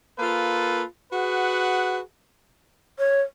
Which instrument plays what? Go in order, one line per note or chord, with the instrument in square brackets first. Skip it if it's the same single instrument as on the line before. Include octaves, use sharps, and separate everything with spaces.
[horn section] A#3 F4 A4 B4
F#4 G#4 B4 F#5
[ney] C#5